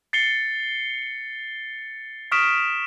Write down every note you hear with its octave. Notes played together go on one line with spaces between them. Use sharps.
A6 C7 C#7 G7
C#6 D#6 F6 B6 D7 E7